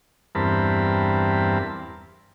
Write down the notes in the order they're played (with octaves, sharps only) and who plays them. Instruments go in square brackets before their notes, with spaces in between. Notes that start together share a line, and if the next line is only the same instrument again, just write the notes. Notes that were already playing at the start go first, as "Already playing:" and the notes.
[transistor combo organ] E2 G2 C4 A#4 A5 B5